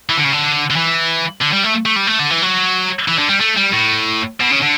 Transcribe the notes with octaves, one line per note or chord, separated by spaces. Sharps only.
E3
D3
C#3
D3
D3
E3
D3
G3
A3
A3
G3
A3
D3
E3
F#3
E3
D3
G3
A3
G3
A2
B2
C#3
D3